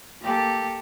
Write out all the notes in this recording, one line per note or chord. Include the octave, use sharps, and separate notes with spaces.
A#3 G4 A4